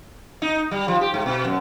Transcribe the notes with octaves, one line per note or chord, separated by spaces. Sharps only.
D#4
G3
F3
G4
G#2
B2
F#2